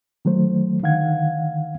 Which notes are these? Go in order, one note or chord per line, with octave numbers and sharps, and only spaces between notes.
D#3 F#3 A3 C5
D3 D#3 F5 F#5 G#6